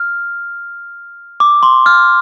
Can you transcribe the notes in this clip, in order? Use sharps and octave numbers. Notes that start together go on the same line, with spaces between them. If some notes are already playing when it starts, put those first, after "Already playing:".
Already playing: F6
D6
C6
F6